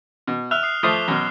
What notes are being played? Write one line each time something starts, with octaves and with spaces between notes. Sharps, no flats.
B2
E5 F6 F#6 F7
D#6 C7
F3 A3 D6 D#6 C7 G7
F#2 B2